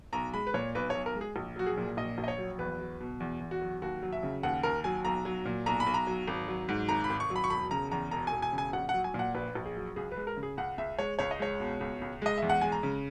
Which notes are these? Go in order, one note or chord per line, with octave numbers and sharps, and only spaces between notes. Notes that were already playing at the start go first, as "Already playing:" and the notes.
B1 A#5
G#3 B5
B4
A#2 C#5
B1 B4
B1 C#5
A#4
G#3
G#4
A#1
F#3 F#4
G#4
A#2
A#1 D#5
A#1
D#5
C#5
F#3
E2 B4
F#3
B2
E2
E2
F#4
F#3
D#2 F#4
F#3
E5
C#3
D#2 F#5
D#2 A#4
F#3 G#5
B1 A#5
F#3
A#2
B1 A#5
B5
B1
A#5
F#3
G#1
F#3
G#2
G#1 A#5
B5
G#1
C#6
F#3
B5
C#6
E1 B5
C#3 A#5
E2 A#5
E1 A#5
G#5
E1
G#5
C#3
G#5
A#1 F#5
F#3 F#5
G#5
A#2
F#5
A#1 B4
A#1
G#4
F#3
C#2 G#4
B4
G#3
A#4
C#3
G#4
C#2 F#5
C#2 E5
G#3 C#5
C#2 C#5
D#5
G#3 C#5
B2
C#2
C#2
G#3 D#5
E2 E5
F#5
G#3 G#5
A#5
C#3